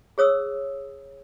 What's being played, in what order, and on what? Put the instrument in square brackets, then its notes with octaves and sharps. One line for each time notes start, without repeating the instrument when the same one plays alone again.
[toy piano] G#4 C#5 D#6 E6